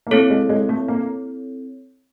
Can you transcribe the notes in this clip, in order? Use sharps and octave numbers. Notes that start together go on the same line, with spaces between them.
A#3
A3 C4 E4 A4 C#5
G#3
G#3
A3
A#3